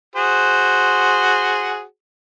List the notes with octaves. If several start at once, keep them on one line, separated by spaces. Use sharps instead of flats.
F#4 G#4 C5